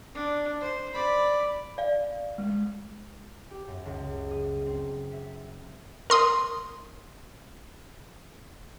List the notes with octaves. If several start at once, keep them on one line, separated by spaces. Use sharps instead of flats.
D4
C5
D5 B5
D5 F5
G#3
G4
F#2
C#2
D#6
C4
E5
A#4 C6 D#6